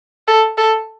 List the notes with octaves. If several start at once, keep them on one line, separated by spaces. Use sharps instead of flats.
A4
A4